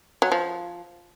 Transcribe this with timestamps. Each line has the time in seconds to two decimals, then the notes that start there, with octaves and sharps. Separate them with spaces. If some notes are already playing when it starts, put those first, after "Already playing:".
0.22 F#3
0.32 F3